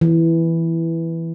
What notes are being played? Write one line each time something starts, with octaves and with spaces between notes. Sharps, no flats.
E3